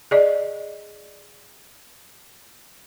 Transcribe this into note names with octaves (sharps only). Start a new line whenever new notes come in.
G#4 D5 D#5